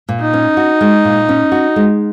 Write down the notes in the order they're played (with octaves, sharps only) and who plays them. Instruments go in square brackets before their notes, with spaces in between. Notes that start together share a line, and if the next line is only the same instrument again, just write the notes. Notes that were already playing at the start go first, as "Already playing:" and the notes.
[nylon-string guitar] A#2
[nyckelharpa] D#4
[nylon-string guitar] C#4
F#4
G#3
A#2
C#4
F#4
G#3